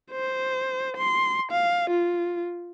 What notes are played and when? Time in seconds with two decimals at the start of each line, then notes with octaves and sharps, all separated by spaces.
0.11 C5
0.97 C6
1.52 F5
1.90 F4